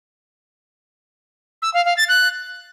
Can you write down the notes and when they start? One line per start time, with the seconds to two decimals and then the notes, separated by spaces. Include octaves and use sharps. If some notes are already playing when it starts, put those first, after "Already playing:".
1.62 E6
1.74 F5
1.85 F5
1.97 A6
2.09 F#6